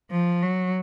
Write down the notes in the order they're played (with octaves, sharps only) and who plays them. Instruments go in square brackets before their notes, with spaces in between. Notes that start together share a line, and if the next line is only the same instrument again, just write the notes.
[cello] F3
F#3